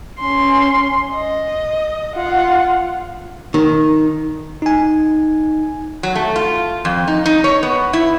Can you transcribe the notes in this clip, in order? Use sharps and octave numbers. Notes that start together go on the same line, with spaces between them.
C#4 C6
D#5
F4 F#5
D#3
D#4 G#5
F#3
A3
F4
F2
D#4
D#4
C#5
B3
E4